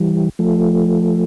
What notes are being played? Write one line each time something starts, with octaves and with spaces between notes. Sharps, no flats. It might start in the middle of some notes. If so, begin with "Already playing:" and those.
Already playing: E3 G3
F3 A3